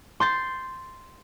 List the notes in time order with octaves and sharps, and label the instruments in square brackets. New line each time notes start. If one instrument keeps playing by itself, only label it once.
[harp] C6 G6 A6 C7